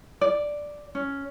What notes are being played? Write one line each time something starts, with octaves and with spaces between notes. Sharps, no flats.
D5
C#4